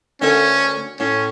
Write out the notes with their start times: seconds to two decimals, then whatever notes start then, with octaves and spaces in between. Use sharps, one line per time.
0.22 D2 A3 C#4 A#4
1.00 A2 C#4